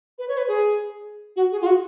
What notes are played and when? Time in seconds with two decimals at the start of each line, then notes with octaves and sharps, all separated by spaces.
0.18 B4
0.28 C#5
0.37 B4
0.48 G#4
1.36 F#4
1.52 G#4
1.61 F4
1.66 F#4